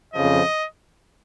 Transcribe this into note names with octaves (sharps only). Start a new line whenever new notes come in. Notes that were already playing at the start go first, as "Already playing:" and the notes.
F2 C#3 F3 D#5